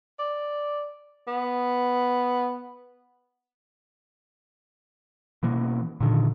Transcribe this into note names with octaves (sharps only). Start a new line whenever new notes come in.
D5
B3
B2 E3 A#3
A#2 D3 D#3